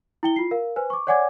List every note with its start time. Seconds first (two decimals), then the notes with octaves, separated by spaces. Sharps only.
0.23 E4 G5 G7
0.36 F4 C7
0.51 A#4 F5
0.76 B4 C5 G#5
0.90 C#6 D6
1.07 C#5 D5 F#5 G#5 D6 G#6